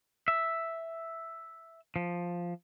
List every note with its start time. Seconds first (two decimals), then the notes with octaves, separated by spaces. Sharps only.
0.28 E5
1.96 F3